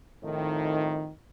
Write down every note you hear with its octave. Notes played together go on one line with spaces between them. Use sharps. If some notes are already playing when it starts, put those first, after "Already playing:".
F2 A2 D#3